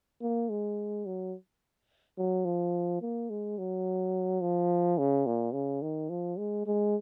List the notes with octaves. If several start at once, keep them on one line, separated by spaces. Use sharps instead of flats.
A#3
G#3
F#3
F#3
F3
A#3
G#3
F#3
F3
C#3
A#2
C#3
D#3
F3
G#3
G#3